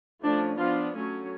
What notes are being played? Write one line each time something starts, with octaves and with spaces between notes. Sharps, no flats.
F3 A3 C#4 D4
F3 B3 D4 F4
F#3 A3 C#4